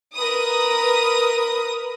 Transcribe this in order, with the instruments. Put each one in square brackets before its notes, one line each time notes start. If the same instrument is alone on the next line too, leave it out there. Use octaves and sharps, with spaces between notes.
[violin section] A#4 B4 D#6